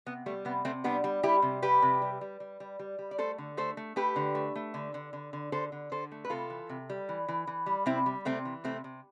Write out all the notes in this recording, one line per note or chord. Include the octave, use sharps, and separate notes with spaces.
C3 B3
G3 A3
C3 B3
C3 A3 C4
G3 B3 D4
G3
G3 E4 G4
C3
G3 G4 B4
C3
G3
G3
G3
G3
G3
G3
D5
A3 A4 C5
D3
A3 A4 C5
A3
A3 G4 B4
D3
A3
A3
D3
D3
D3
D3
D3 A4 C5
D3
D3 A4 C5
A3
B4
C3 F4 A4
E3
C3
G3
E3
E3
E3
G3
C3 C4 E4
G3
C3 A3 C4
E3
C3 A3 C4
C3